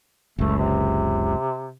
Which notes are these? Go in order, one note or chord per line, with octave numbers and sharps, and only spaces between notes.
F#1 C#2 A3
C3